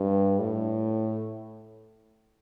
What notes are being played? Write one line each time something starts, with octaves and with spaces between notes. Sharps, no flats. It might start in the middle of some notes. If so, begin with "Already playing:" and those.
Already playing: G2
A2